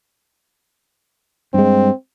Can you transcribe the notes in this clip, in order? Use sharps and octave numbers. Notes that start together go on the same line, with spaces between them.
G2 G#3 C4